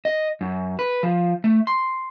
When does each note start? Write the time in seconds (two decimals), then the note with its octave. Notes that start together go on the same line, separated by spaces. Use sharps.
0.05 D#5
0.41 F#2
0.79 B4
1.03 F3
1.44 A3
1.67 C6